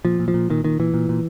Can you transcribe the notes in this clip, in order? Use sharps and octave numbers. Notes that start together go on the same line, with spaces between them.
A#2 F3
A#2
F3
A#2
A#2 D#3
A#2 D#3
A#2 E3
A#2
A#2